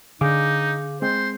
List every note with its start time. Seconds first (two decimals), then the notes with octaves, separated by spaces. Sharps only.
0.21 D3 D#4 G#4 F5 D6
1.02 G#3 C4 C5